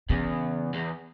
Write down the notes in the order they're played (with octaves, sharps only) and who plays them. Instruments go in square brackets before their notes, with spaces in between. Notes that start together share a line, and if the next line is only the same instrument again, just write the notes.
[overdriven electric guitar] E2 [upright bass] C#3
[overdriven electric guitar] E2